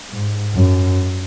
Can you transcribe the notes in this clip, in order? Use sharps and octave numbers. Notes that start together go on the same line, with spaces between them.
G#2
F#2